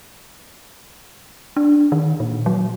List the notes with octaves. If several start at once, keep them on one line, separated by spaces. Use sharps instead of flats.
D4
D#3
A#2
F#3